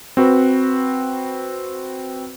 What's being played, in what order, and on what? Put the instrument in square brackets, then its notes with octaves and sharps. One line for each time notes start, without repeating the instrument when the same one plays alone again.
[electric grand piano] C4 F#4 B4